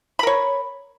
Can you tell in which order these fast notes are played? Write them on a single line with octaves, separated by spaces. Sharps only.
B5 A#4 C#5